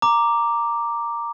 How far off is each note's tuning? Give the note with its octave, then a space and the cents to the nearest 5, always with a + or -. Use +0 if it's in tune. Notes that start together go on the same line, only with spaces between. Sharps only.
A#5 +0 D6 +0